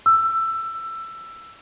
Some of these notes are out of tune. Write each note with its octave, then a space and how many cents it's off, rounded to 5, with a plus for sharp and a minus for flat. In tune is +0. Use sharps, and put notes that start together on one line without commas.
E6 +15